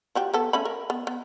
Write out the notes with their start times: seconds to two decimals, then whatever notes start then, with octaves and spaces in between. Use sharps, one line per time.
0.15 F3 F#4 G4
0.34 B3 A4
0.53 A3 C#4 B5
0.65 A#4
0.90 B3
1.07 B3